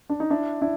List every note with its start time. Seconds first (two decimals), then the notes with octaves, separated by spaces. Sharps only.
0.10 D4
0.20 D#4
0.30 D4 E4
0.62 D4 E4